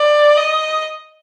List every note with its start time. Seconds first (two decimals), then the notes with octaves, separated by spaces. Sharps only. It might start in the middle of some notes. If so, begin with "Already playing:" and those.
Already playing: D5
0.37 D#5